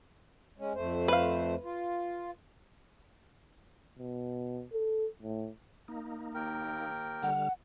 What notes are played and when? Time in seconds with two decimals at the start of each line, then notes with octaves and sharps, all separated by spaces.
0.58 G#3 C#4
0.74 F2 A3 C5
1.08 B4 F5
1.63 F4
3.99 B2
4.73 A4
5.22 A2
5.88 A#3 D#4
6.35 D#2 A#4 G5
7.23 D3 G3 F#5 F6